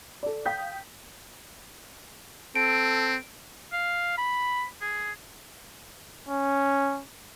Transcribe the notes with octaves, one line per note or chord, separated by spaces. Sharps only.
A4 D5
F5 G5 D#6 G6 B6
C4 A4 D7
F5
B5
G#4
C#4